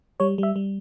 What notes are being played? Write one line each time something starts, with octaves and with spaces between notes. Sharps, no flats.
G3 C#5
G3 E5
G3